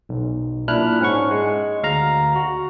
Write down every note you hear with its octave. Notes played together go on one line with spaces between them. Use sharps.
B1
A#2 D4 E4 F6 F#6
G#2 C#4 F#5 C#6
G#3
D2 F5 A#5
F#4